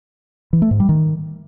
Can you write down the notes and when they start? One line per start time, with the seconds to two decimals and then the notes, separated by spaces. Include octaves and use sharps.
0.53 E3
0.62 A3
0.71 G#2
0.80 G3
0.89 D#3